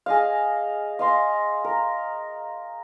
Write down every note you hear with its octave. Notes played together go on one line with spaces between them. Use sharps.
G#4 D#5 F5
D#5 F5 C6
A#4